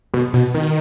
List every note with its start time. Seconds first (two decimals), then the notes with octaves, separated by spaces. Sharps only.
0.14 B2
0.34 B2
0.54 D#3